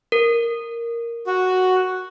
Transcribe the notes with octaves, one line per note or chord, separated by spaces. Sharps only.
A#4
F#4